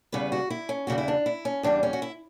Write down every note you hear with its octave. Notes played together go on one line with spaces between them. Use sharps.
E2 C#3 G3 B3 B4
F#4
E4
C#4
E2 C#3 E3 G3 F#4
E4
D4
E4
C#4
E2 C#3 E3 G3 D4
C#4
F#4
E4